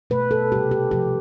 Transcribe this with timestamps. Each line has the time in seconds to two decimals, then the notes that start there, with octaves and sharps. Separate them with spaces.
0.10 B2 A3 B4
0.31 A4
0.52 C3 G3 G4
0.71 G4
0.91 C3 F3 A3 G4